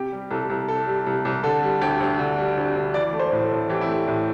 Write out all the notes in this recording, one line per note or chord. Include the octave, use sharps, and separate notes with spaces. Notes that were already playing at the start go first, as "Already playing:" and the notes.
Already playing: C3 G4
G3
C2 A4
C2
C3 A4
G3
C2
C2
D3 A4
G3
D2 G4
D2
D3
G3
D2
D2
E3 D5
A3
C5
A2
A4
A2
E3 G4
E4
A3 G4
A2